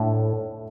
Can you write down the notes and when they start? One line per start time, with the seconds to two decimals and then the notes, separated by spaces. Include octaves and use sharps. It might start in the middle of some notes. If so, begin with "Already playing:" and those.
Already playing: A2 A3 D4 E5